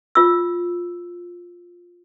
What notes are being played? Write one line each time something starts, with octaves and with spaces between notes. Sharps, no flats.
F4 E6